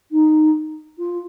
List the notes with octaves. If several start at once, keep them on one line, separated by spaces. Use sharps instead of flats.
D#4
F4